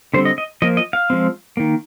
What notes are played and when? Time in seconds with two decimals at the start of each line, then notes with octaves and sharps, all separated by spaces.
0.14 D3 G3 C4 C5
0.25 D#5
0.38 D#5
0.62 F3 A#3 D#5
0.77 D#5
0.93 F5
1.10 F3 G#3 C4
1.57 D#3 A#3